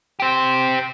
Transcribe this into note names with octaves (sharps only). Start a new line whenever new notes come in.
G4 C5